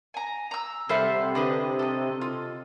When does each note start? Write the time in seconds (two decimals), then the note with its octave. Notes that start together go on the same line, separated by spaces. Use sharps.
0.14 G#5 A#5
0.51 A#5 E6
0.89 C3 G3 A4 C5 E5 F#5
1.35 D3 D4 B4 D#5
1.79 A4 D#5
2.21 F4